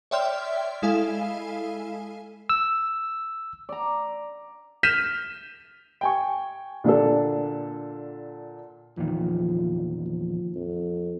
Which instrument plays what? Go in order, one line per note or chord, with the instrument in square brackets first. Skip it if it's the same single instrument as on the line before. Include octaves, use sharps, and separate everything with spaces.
[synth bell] C#5 D5 E5 G5 C6 F6
G#3 E4 A4 F5 G#5
[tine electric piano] E6
[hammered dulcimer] D5 A#5
[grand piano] F6 G6 B6 D#7 E7
[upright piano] G5 G#5 C#6
A#2 D3 D4 A4
[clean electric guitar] E2 A#2 D#3 [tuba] F3
[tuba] F3
F2